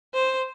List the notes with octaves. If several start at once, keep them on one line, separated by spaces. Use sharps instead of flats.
C5